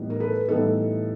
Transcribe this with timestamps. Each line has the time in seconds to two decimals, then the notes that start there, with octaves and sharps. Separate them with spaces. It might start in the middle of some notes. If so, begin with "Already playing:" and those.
Already playing: A2 E3 G3 B3 D#4
0.10 A#4
0.20 A4 B4
0.48 A2 E3 G3 B3 D#4 A4